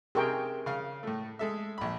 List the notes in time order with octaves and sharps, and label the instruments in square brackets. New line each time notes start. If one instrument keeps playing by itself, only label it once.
[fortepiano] C3 C#6 [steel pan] G#4 A#4 G5
[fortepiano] C#3 F5
A2 A3
G#3 A4 E5
A#1 B5